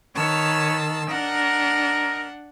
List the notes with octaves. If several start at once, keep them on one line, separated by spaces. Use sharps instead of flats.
D#3 B4 C#5 A5 E6
D4 D#4 A#4 F#5